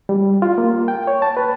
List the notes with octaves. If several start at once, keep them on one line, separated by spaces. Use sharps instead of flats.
G3
F4
A#3
G5
C#5
A5
B4